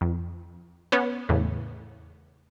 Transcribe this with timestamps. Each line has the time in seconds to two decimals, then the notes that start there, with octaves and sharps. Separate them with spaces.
0.01 F2
0.92 B3 C#4 C#5
1.29 E2 A2 C#3